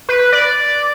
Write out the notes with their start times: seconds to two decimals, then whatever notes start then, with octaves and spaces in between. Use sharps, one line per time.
0.09 B4
0.33 D5